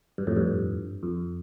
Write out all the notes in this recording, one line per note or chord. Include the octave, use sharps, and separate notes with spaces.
G2
F2 A2
G2
F2